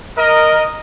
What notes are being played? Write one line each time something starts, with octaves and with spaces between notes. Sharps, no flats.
A#4 D#5